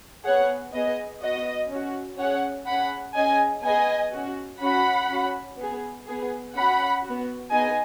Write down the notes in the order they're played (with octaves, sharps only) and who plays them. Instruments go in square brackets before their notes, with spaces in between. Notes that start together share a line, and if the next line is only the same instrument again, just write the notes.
[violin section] B3 G#4 C#5 F#5
B3 G#4 D#5
B3 F#4 D#5
C#4 F#4
C#4 G#4 C#5 F#5
C#4 G#4 F#5 B5
C#4 G#4 D#5 G#5
B3 G#4 D#5 G#5
C#4 F#4
C#4 F#4 F#5 B5
C#4 F#4
B3 G#4
B3 G#4
C#4 F#4 F#5 B5
B3 F#4
B3 D#4 G#4 D#5 G#5